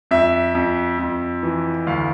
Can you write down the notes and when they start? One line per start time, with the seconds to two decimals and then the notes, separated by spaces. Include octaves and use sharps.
0.11 F2 E5
0.55 F2
0.99 F2
1.43 E3
1.87 D2 F5